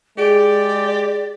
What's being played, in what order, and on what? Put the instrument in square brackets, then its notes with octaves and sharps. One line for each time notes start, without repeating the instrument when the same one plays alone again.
[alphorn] G#3 [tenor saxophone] G4 [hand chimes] G#4 D7 [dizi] D5